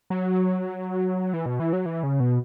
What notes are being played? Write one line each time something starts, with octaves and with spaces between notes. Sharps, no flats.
F#3
E3
B2
E3
F#3
E3
C#3
B2